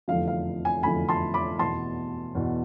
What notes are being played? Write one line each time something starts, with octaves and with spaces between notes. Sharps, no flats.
F1 E2 D3 F3 F5
F5
G#5
F1 E2 D3 F3 G#5 B5
A5 C6
B5 D6
E2 B2 A5 C6
E2 B2